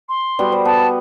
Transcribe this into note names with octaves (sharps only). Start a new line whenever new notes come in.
C6
G3 B3 F#4
C5
B3 A5